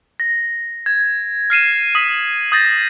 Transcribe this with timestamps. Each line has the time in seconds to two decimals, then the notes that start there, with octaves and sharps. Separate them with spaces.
0.20 A#6
0.86 G#6
1.50 F6 C7 D#7 E7
1.95 D#6 B6
2.52 D#6 G6 A6 A#6